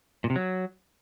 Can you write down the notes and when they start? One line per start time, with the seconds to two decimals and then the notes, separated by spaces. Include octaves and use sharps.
0.24 A#2
0.30 C3
0.36 F#3